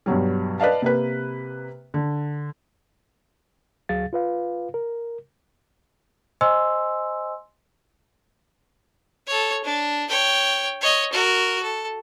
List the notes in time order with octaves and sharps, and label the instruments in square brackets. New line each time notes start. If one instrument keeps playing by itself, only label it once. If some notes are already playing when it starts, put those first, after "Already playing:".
[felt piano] G2 B2 F#3 G3
B4 D5 D#5 F5 A5
C3 A#3 B4
D3
[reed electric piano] D2 F#3 G#4 F5 A6
F4 B4 F5
A#4
[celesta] C5 D#5 G#5 C6 E6
[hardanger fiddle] A4 C#5
D4
C#5 G5
C#5 D#5
F#4 A#4
A4